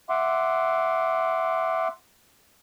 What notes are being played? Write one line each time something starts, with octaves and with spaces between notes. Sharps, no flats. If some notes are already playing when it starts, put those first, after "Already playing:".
E5 F#5 C6 D6